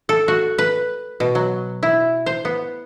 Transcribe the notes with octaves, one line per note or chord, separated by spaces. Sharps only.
A4
F#4
B4
B2
F#3
E4
C5
B3